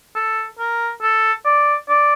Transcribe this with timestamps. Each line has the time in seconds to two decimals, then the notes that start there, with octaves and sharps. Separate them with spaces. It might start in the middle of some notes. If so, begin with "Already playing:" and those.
0.15 A4
0.59 A#4
1.02 A4
1.45 D5
1.89 D5